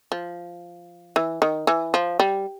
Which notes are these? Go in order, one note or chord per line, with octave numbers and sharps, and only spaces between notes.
F3
E3
D#3
E3
F3
G3